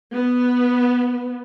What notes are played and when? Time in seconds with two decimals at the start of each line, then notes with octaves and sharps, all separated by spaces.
0.14 B3